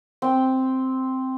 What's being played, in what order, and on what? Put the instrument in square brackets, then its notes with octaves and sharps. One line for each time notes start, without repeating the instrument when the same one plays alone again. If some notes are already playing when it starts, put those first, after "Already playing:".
[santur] C4 G5